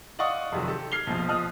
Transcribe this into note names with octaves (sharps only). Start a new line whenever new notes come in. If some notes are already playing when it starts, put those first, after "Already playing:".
D5 D#5 F5 F#5 C#6 D#6
F2 C3 D#3 F#3
G4 A4
F6 G#6 C7 F7 G7
A#1 B2 F3
F3 D#5 D#6 F6 F#6